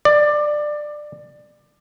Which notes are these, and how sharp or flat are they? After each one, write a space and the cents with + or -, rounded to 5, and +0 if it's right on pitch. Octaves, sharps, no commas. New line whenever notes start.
D5 +20